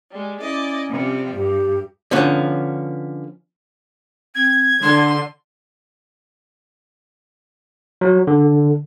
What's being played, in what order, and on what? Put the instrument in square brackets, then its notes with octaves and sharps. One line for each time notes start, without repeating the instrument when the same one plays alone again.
[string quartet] G3 G#3
[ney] C#4 [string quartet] E4 D5 D#5
[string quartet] C3 F3 G3
[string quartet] G2 [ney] G4
[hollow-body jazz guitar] D3 F3 B3 C#4
[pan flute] C4 [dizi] G#6
[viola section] D3 [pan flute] D4 [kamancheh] C6
[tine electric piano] F#3
D3